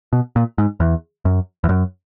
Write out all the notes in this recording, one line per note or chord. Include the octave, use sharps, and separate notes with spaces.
B2
A#2
G#2
E2
F#2
E2
F#2